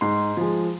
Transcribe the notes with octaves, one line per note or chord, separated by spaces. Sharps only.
G#2 C6
F3 G#3